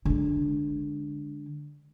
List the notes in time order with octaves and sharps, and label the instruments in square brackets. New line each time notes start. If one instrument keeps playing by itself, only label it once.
[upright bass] D3 G#3